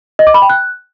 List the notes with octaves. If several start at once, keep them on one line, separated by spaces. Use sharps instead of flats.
D#5
D6
B5
G5
F#6